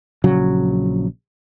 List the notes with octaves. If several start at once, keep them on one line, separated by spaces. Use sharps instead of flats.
A#1 C#3 F#3